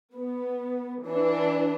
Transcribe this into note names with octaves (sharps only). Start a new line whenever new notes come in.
B3
E3 D4